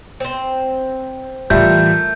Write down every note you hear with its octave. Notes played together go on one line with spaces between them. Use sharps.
C4 C5
A2 E3 G3 A3 F4 A#4 E5 G6